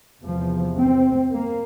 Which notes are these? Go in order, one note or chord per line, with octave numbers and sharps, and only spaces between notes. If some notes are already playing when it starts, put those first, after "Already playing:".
E2 C3 F3
C4
A#3